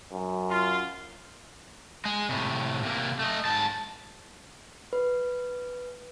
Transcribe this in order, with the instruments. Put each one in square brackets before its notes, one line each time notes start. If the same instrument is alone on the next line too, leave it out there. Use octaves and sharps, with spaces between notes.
[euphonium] F#2
[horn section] F4
[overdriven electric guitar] G#3 G#4
A2 C3
C3 A#3
A3 D#5
G#2 A5
[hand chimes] B4